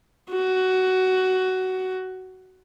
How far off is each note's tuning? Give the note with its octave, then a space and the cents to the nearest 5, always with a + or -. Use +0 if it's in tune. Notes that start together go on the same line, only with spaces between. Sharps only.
F#4 +15